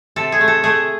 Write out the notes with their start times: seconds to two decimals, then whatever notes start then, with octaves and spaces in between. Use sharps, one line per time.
0.16 C3 A4
0.32 G#4
0.41 A3
0.48 A4
0.64 A3 G#4